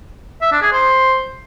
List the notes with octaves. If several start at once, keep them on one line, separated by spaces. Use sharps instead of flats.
E5
D4
G#4
C5